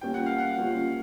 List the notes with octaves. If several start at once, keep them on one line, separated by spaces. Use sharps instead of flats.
G3 A#3 C#4 F4 G5
F#5
F5
F#5
G3 A#3 C#4 F4